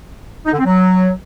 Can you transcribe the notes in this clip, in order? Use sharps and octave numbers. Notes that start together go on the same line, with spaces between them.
D#4
D3
C4
F#3